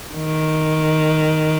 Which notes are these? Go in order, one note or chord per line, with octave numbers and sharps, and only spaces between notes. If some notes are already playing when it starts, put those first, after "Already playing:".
D#3